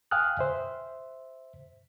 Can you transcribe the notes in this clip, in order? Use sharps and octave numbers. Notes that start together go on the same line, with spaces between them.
F5 G5 G#5 D#6 F6 F#6
C5 E5